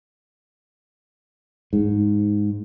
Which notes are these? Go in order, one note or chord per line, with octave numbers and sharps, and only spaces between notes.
G#2